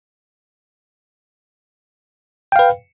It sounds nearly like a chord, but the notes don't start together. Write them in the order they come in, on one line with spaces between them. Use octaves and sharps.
G5 F5 B4